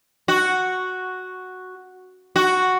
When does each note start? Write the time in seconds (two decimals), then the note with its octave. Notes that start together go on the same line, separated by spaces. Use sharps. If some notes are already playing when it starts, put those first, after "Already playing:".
0.28 F#4
2.36 F#4